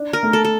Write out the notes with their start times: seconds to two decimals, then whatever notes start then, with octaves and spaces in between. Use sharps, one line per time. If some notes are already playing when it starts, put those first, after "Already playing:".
Already playing: D4
0.13 A#4
0.23 A3
0.33 A4
0.45 A4